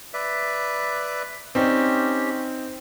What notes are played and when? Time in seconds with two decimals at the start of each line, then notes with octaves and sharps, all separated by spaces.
0.14 B4 D5 E5
1.55 C4 C#4 D#4 G4 D5